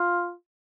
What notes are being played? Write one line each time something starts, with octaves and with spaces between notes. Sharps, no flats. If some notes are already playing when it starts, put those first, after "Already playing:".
Already playing: F4